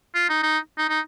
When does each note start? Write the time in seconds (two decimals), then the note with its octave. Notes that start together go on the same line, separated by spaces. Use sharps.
0.15 F4
0.29 D#4
0.43 D#4
0.78 D#4
0.89 D#4